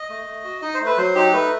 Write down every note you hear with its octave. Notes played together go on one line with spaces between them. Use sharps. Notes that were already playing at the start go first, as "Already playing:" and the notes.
Already playing: D#5
A3
A3
F#4
D#4 D#5
C5
A3
B4
F#3 C5
D#4 G4
A3 B4